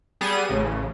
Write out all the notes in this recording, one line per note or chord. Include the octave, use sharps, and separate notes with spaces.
G3 B3 G#4 D#7
A1 C#3